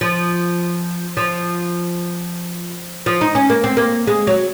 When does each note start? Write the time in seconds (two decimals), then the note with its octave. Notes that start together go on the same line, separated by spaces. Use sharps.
0.01 F3
1.17 F3
3.06 F3
3.21 D#4
3.35 C#4
3.50 A#3
3.64 C4
3.77 A#3
4.07 G#3
4.27 F#3